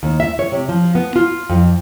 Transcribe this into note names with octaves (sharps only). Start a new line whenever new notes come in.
D#2
E5
C#5
C3
F3
B3
F4
F2